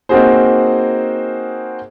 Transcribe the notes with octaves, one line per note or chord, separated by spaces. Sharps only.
A#3 C4 D#4 F#4 G#4 C5